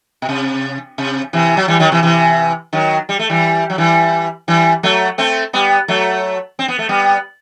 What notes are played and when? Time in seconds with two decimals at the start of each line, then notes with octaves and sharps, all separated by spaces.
0.22 B2
0.29 C3
0.98 C3
1.33 C3 E3
1.57 F#3
1.68 E3 G3
1.79 D#3 F#3
1.92 C3 E3
2.03 C3 E3
2.73 D#3 F#3
3.09 G3
3.19 A3
3.30 E3 G3
3.70 F#3
3.78 E3 G3
4.48 E3 G3
4.83 F#3 A3
5.18 A3 C4
5.53 G3 B3
5.88 F#3 A3
6.59 C4
6.68 B3
6.79 A3
6.89 G3 B3